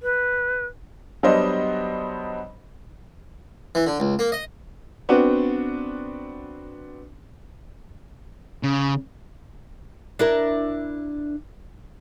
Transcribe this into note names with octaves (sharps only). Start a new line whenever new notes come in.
B4
F#3 G3 B3 D4 C5 D#5
E3
D3
C#2
A#3
D#5
B3 C4 D4 F#4
C#3
D4 E4 A#4